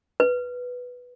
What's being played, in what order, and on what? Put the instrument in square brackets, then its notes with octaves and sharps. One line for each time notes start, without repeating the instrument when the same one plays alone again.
[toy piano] B4